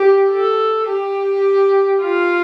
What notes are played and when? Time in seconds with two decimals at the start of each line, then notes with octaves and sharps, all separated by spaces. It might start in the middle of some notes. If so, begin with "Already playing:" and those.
Already playing: G4
0.30 A4
0.88 G4
2.02 F4